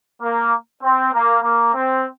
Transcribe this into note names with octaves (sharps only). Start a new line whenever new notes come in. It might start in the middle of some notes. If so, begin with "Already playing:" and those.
A#3
C4
A#3
A#3
C4